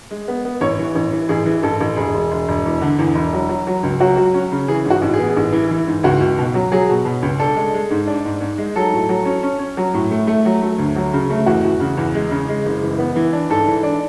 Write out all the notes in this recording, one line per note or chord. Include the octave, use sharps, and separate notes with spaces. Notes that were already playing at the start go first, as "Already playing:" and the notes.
G#3
B3
B3
A1 C#5
E3
A1
E3
A1 G#4
E3
A1 A4
A1
E1 G#4
E1
E1
E1
E2
D3
E2
E1
F#3
F#3
F#3
C#2
F#3 F#4
F#3
C#4
C#3
E3 G#4
G#2
F#4
A1
G#4
B3
A1
E3
E3
G#2
C#2 F#4
C#2
B2
F#3
F#3 G#4
B2
B2
C#2
D4 A4
G#3
G#3
G#2
D4
G#2
G#2
G#3
F#3 A4
A2
F#3
C#4
C#4
C#4
F#3
A2
A3
A3
F#3
A3
D2
F#3
C#3
A3
E2 F#4
E2
C#3
E2
G#3
C#3
G#3
F#1
E3
B3
E3
D4
G#2 A4
E3
D4